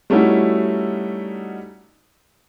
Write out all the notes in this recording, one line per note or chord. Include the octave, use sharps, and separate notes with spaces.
G3 A3 C#4 D#4 E4 F#4